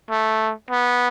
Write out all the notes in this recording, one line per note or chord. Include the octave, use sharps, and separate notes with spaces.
A3
B3